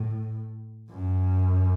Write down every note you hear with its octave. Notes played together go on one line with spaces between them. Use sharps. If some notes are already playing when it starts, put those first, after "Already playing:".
Already playing: A2
F#2